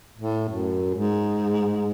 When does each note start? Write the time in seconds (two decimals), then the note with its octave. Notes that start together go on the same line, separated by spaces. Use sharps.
0.17 A2
0.48 F#2
0.94 G#2